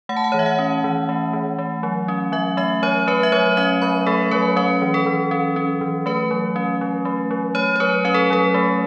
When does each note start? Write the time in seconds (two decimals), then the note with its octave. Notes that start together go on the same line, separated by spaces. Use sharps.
0.09 A3 F#5
0.17 A5
0.24 F#5
0.32 E3 C#5
0.39 E5
0.46 F#5
0.59 C#4
0.84 E3
1.09 A3
1.33 E3
1.59 A3
1.83 F#3
2.08 C#4
2.32 F#3 E5
2.57 A3 E5
2.83 F#3 C#5
3.07 A3 B4
3.23 E5
3.32 F#3 C#5
3.57 C#4 E5
3.82 F#3 B5
4.06 A3 A4
4.31 F#3 B4
4.56 C#4 B4
4.82 E3
4.94 A4
5.06 E3
5.31 C#4
5.56 C#4
5.81 E3
6.06 A3 B4
6.31 F#3
6.56 C#4
6.81 F#3
7.05 A3
7.31 F#3
7.55 A3 C#5
7.76 C#5
7.80 F#3 B4
8.05 C#4 B4
8.14 A4
8.30 F#3 A4
8.54 A3